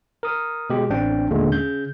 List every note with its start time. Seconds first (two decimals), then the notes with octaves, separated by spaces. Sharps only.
0.23 A#4 D#6
0.70 B2 G#3 G4
0.90 A1 C4 D4 G5
1.30 D#2 A#2 D3 G#3 A3
1.50 C#3 G6